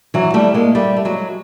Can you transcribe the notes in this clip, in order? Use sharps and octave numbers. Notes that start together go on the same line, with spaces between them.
E3 F#3
G3 A3
G#3 A#3
G3 A3
A3
F#3 G#3